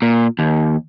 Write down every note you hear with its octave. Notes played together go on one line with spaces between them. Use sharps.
A#2
D#2